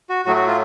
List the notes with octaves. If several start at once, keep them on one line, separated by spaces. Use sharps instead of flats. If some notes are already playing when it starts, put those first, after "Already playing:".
F#4
A2 F#3 A3 F#4
F#4
F4